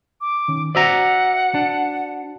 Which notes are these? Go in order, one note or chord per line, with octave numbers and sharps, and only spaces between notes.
D6
D#3 C#4
F#4 C5 D5 E5 F#5 A#5
D4